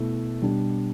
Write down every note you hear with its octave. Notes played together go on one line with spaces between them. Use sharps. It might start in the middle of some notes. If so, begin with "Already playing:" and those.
Already playing: B2 A3 E4
B2 G3 D4